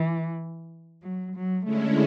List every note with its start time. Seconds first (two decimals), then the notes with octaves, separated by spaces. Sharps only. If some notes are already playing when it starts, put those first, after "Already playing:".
Already playing: E3
1.02 F#3
1.32 F#3
1.64 D3 G#3 A3 C#4 E4